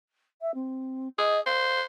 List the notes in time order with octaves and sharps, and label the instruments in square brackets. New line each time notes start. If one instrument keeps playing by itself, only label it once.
[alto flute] E5
C4
[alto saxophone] G#4 [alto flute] D#5
[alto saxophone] C5 [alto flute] F5